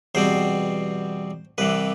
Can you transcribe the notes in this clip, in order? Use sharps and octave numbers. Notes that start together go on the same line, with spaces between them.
E2 B2 G3 C4 C5
C2 C3 E3 B4